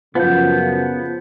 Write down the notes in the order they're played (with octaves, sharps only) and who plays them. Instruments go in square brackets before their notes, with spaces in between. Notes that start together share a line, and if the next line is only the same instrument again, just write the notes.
[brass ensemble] F#2 C#3 [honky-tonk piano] F3 [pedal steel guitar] B3 F#5 G6